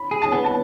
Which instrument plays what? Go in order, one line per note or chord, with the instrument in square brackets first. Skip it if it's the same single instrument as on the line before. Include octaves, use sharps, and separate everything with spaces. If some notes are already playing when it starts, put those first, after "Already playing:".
Already playing: [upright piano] B5
[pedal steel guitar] G#4
[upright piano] A5
[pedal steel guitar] B3
[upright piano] A5